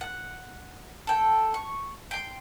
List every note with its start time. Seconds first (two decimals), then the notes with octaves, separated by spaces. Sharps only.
0.01 F#5
1.07 A4 G5
1.54 C#6
2.11 G5 C6